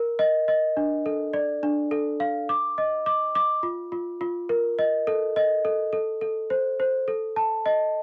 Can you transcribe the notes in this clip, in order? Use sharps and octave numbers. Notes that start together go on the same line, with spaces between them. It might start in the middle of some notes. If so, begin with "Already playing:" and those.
Already playing: A#4
D#5
D#5
D4
A4
D5
D4
A4
F5
D6
D#5
D6
D6
F4
F4
F4
A#4
D#5
A4
D#5
A4
A4
A4
C5
C5
A4
A5
D#5